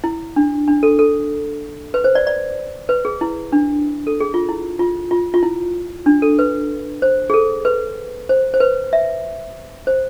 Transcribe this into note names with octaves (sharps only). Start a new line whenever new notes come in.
E4
D4
D4
A4
A4
B4
C5
D5
D5
B4
G#4
E4
D4
A4
G#4
F4
E4
F4
F4
F4
E4
D4
A4
B4
C5
G#4
A4
B4
C5
C5
B4
E5
C5